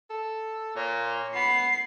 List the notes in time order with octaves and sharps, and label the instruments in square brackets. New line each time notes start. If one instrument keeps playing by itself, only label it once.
[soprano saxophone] A4
[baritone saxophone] A#2 [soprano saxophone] C#5
[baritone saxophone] B3 [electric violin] C7